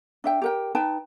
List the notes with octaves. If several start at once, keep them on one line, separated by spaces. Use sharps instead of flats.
D4 E5 G5
G4 A#4 G5
D#4 B4 G5 A5